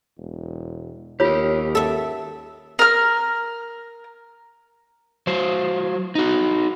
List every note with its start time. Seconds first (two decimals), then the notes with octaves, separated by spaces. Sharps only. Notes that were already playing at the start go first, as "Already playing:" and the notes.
0.18 E1
1.20 D#2 F4 G4 A#4 C#5
1.75 A4 E5
2.79 A#4 F6
5.27 F#3 C5
6.15 D#4 F#4